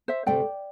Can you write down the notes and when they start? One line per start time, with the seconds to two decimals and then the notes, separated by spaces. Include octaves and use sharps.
0.08 C5 E5
0.27 D2 C3 A3 D5 G5